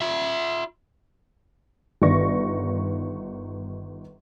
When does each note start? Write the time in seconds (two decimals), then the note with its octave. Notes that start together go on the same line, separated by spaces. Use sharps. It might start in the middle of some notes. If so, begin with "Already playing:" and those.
0.01 F4 E5
2.02 G1 D#3 B3 D5 C#6 A#6